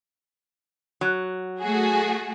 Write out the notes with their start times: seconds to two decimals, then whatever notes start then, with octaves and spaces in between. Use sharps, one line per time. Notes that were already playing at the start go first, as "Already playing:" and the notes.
1.01 F#3
1.60 A3 F#4 G#4